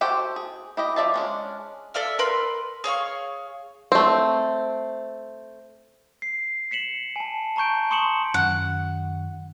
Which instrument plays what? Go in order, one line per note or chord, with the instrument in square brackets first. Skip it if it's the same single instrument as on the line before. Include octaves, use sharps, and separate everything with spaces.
[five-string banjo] F#4 G4 A4 C5 G5
G#4
E4 G4 D#5
F3 D5 E5 A5
G#3 C#4 D4
[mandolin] A4 D5 E5 F5
A#4 B4 B5 C6
G#4 C#5 F5 C#6
[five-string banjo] A3 C4
[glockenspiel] C7
B6 C#7 E7 F#7
G#5 A5
A5 A#5 C#6 G6 D7
C6 C#6 D#6 C#7 E7 F#7
[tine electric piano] F#2 D#3 [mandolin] F#5